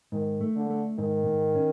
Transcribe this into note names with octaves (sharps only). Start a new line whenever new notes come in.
G#2 D#3
A3
D3
A3
G#2 D#3
G#2
C#4